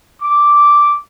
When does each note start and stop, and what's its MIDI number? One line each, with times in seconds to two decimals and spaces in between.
0.22 0.96 86